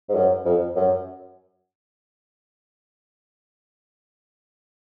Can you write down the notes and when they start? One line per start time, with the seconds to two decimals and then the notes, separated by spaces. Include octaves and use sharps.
0.09 G#2
0.15 F#2
0.45 F2
0.76 F#2